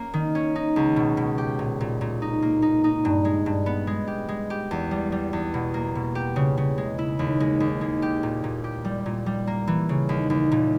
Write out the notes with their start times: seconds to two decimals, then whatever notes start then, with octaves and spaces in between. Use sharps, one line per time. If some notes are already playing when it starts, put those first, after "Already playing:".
Already playing: A#3 C#4
0.14 D#3
0.35 C#4
0.55 D#4
0.76 C#2
0.96 B2
1.17 B2
1.38 G4
1.59 A#2
1.81 A#2
2.01 A#2
2.22 D#4
2.42 A#3
2.62 D#4
2.84 D#4
3.05 G2
3.25 G#3
3.46 G2
3.66 B3
3.87 G#3
4.07 G4
4.29 G#3
4.50 G4
4.71 E2
4.91 G3
5.12 G3
5.33 E2
5.54 B2
5.74 A#3
5.95 B2
6.15 G4
6.36 C#3
6.57 C#3
6.78 G#3
6.98 E4
7.19 D#2
7.40 G#3
7.60 D#2
7.81 G#3
8.02 G4
8.23 A#2
8.44 A#2
8.64 G4
8.85 G3
9.06 A#2
9.26 G3
9.47 A#3
9.67 E3
9.89 C#3
10.09 D#2
10.30 D#2
10.52 A#2